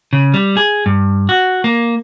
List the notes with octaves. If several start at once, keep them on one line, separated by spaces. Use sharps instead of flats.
C#3
G3
G#4
G2
F#4
A#3